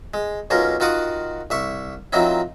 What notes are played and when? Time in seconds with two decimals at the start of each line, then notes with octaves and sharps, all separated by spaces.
0.14 G#3
0.50 B1 B2 C#4 F4 A#4
0.80 D#3 F4 F#4 F#5 D6 D#6
1.50 C2 E5 C#6
2.13 D#3 F3 F#3 C4 D#4 E4